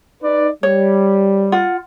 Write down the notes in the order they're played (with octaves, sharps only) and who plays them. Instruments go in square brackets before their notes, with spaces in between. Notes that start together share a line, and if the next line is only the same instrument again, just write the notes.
[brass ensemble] D#4 B4 D5
[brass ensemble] G3 [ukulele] C#5
[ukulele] F4 F#5